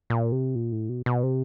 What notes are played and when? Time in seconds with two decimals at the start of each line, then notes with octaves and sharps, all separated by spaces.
0.10 A#2
0.32 C3
0.55 A#2
0.72 A2
0.89 B2
1.06 B2
1.23 C3